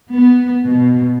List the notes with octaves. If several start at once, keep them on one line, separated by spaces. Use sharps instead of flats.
B3
B2